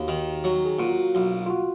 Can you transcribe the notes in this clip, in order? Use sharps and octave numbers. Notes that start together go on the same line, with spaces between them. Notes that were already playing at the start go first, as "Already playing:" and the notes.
Already playing: D#2 F#4
D#3
F#3
G#4
A#2 F#4
B1
F4
F#4